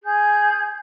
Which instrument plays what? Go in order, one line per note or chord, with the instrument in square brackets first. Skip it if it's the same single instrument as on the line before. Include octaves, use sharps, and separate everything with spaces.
[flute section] G#4 G6